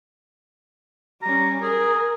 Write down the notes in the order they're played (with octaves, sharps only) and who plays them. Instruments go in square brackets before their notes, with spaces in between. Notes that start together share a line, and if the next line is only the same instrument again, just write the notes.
[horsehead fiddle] G3 C#4 [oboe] A#5
[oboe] G#4 [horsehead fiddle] A#4